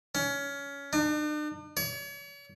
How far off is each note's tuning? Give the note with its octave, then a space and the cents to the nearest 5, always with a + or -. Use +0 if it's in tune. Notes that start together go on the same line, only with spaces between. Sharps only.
C#4 +20
D4 +45
C#5 +40